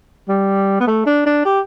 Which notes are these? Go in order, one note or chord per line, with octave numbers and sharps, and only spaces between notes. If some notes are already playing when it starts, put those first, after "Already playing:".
G3
B3
A3
D4
D4
G4